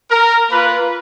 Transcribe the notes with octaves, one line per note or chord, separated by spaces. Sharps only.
A#4
A#3 F4 B4